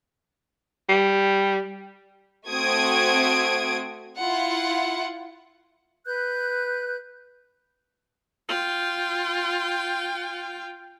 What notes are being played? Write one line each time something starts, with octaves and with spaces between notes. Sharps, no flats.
G3
A3 C4 F#4 D#6 G#6 D7
E4 F4 F#5
B4 F#6 G6
F4 G5